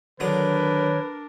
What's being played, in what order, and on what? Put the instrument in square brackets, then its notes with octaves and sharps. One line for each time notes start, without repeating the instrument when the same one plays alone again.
[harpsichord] D3 F#3 D#6 [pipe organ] D#3 C#5 [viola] D4 A#4 [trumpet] B4